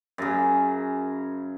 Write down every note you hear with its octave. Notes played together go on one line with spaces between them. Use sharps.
F#2 C#3